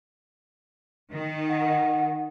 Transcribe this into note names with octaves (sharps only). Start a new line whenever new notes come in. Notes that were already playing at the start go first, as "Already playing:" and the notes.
D#3
F#5